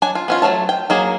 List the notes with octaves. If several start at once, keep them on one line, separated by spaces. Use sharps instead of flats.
F#3 D4 G#5
F4
B3 C#4 F4
F#3 A3 C#5 A5
G5
F#3 A#3 G#4